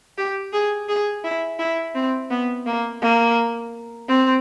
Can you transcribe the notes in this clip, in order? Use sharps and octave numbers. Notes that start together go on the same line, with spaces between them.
G4
G#4
G#4
E4
E4
C4
B3
A#3
A#3
C4